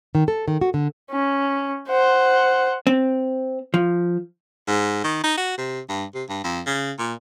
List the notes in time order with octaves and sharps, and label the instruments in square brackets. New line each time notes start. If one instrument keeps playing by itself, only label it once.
[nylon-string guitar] D#3
A4
D#3
F#4
D3
[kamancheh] C#4
C5 F#5
[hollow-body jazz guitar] C4
F3
[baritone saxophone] G#2
D#3
D#4
F#4
C3
G2
C3
G2
F2
C#3
A#2